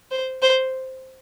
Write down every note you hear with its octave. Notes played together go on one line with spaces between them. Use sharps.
C5
C5